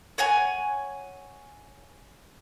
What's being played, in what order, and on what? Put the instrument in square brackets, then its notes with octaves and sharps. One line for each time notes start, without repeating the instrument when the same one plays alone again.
[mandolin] C#5 F#5 G#5